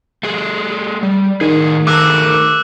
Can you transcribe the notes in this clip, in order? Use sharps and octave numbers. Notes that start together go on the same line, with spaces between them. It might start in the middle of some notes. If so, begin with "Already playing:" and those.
A3 G#4
G3
A2 D#3 G#4
A3 G#4 A#4 D6 E6 F#6